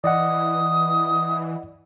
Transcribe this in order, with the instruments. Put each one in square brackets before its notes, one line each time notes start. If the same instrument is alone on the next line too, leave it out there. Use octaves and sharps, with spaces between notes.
[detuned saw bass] E3 [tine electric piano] D5 D#5 F#5 [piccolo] D#6